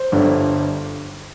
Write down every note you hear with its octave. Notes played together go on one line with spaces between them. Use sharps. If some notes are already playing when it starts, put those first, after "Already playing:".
Already playing: C5
G1 G2 D3 G3